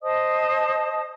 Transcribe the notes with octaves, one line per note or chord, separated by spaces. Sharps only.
C5 D#5 A5 D#6